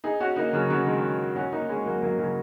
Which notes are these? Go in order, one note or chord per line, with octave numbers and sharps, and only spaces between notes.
D#4 G#4
C#4 F#4
A#3 D#4
C#3 F#3
C#3 F#3
D#3 G#3
C#4 F#4
A#3 D#4
G#3 C#4
F#3 A#3
F#3 A#3
C#3 F#3